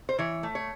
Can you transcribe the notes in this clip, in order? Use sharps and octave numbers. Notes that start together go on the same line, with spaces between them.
C5
E3 C#5
A3
C#5